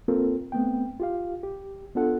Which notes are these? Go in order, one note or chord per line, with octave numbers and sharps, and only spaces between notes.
A#3 C4 F4 A4 A#4
A3 B3 C4 G5
F4 G4 F5
G4
B3 D4 F4 A4 F#5